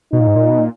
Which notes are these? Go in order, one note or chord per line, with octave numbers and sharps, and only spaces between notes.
B2 D#4
A#2
G#2
A#2
B2
A#2